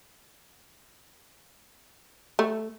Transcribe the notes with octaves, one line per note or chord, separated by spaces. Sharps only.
A3